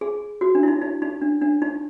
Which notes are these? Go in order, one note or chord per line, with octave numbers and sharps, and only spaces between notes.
G#4
F#4
D4
E4
D#4
D#4
D#4
D4
D4
D#4